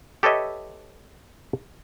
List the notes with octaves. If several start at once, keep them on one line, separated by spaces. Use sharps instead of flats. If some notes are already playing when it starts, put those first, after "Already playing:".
G4 A4 B4 C#5 D#5 E5